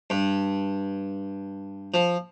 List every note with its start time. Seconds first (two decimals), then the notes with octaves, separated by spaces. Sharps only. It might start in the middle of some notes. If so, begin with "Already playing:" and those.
0.10 G2
1.94 F3